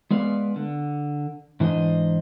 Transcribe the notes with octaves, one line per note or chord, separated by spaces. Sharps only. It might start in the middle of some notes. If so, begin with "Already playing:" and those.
G#3 B3 D5 F5
D3
G#2 E3 D4 C5 D#5